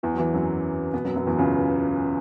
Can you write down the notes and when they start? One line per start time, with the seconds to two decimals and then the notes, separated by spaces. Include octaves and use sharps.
0.03 E2 E3
0.14 F#3
0.18 E2 E3
0.33 F#2 F#3
0.93 B2 B3
1.05 F#2 F#3
1.16 F#2 F#3
1.27 E2 E3
1.38 C#2 C#3